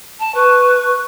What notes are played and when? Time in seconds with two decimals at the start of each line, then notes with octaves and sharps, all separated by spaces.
0.19 A5
0.34 B4 C#6